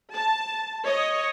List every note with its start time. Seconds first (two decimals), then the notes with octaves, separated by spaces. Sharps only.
0.14 A5
0.85 C#5 D#5